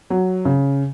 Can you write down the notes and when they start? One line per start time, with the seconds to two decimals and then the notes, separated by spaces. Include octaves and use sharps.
0.10 F#3
0.45 C#3